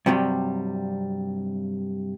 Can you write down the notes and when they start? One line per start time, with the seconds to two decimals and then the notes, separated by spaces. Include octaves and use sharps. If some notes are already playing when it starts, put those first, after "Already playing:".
0.06 G2 C3 F#3 G3